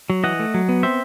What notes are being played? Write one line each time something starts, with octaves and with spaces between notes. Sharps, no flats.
F#3
E3 D#5 F#5
A3
F#3
B3
C4 C5 E5